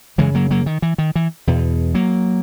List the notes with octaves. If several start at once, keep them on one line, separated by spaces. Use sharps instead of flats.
F#2 C#3 E3 G#3
F#3 A#3
F#3 A#3
D#3
E3
D#3
E3
E2 B2
F#3 A#3